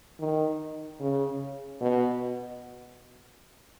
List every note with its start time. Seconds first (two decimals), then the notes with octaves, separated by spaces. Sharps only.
0.20 D#3
1.00 C#3
1.81 B2